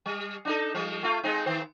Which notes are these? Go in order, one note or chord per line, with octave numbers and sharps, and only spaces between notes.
G3
D4 D#4 A4
F3 G3
A3 F4
G#3 C4 D#4
D#3 C4 C5